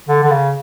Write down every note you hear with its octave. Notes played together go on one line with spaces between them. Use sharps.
D3
D3
C#3